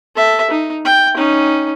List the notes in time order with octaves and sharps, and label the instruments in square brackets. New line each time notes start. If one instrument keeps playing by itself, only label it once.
[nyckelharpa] A4 E5
D#4
G5
C#4 D#4